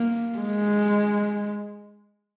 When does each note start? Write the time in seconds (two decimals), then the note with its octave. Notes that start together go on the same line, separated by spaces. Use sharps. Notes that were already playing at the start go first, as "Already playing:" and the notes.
Already playing: A#3
0.38 G#3